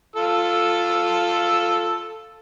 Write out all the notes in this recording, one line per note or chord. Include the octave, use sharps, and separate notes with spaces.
F4 A4 E6